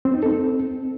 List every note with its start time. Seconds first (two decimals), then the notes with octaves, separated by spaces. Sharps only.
0.05 C4
0.14 D#4
0.23 A4
0.31 C4